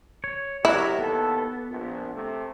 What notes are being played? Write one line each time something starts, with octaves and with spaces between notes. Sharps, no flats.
C#5
F#3 E4 F#4 G4 A#4 C#5
D#2 B3 A4
A#1
C3 A3